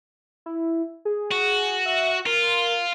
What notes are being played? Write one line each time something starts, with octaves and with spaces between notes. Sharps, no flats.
E4
G#4
F#4
E5
F4 A#4